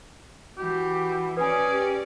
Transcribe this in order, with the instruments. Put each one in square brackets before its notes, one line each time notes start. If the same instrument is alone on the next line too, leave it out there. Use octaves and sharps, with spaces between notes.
[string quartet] E3 [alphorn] F#4 [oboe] G4
[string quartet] C#4 D5 [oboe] G#4 [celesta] B4 G#5
[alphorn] G4